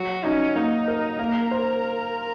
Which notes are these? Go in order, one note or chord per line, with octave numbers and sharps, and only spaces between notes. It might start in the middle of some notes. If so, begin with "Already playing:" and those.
Already playing: F#3 F#4
C#4 D#4
A#3 D#4
A#4
A#3 A#4
C5